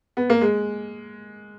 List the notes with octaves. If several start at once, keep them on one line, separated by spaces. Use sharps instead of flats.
B3
A#3
G#3